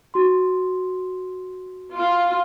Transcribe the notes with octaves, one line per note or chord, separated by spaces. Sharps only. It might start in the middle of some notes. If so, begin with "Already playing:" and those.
F#4 C6
F4